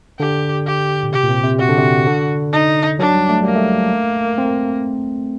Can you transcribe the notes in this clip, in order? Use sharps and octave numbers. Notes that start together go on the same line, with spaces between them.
D3 G4
G4
A#2
C3 G4
A#2
C3
C3
C3 F#4
D3
C3
D3
D#4
F#3 D4
G3
A3
G3 A#3
A3
C4